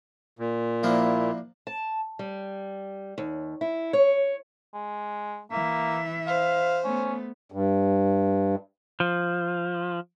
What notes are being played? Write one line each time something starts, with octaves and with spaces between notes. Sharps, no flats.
A#2
F3 A#3 D4 E4
A5
G3
D#2
E4
C#5
G#3
E3 A#3 E5
C5 F5
A3 B3 C#4
G2
F3